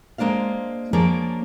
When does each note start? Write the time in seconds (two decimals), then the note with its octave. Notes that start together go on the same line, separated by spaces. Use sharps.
0.18 G#3 A#3 D4 C5 F5
0.93 F3 A#3 D4 G#4 A#4 C#5